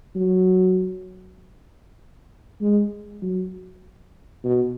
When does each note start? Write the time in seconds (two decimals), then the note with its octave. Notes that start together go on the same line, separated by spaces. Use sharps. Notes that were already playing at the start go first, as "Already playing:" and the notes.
0.16 F#3
2.61 G#3
3.22 F#3
4.44 B2